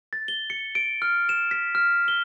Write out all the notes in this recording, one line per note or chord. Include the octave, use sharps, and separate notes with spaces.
A6
G7
C#7
D7
F6
E7
B6
F6
G7